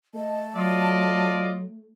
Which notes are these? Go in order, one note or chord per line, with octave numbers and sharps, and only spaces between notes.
A3 D#5 A5
F#3 F4 D5 D#5